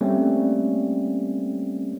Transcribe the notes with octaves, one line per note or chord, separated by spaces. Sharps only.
G3 A3 A#3 C4 C#4